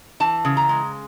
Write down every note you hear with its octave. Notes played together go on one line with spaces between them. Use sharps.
E3 A5
C#3
A#5
G#3